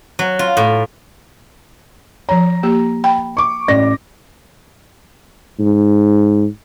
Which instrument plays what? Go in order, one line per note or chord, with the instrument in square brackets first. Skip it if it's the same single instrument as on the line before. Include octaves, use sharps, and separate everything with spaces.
[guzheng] F#3
F4
A2
[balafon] F3 C#5 [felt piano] A#5
[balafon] A#3 G4
G5 B5
[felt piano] C#6 D6
A1 D5 A#6
[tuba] G#2